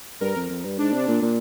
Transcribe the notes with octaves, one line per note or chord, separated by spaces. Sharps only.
G2 A#4
F2
F2
G2
G#2 D4
C3
A#2
A#2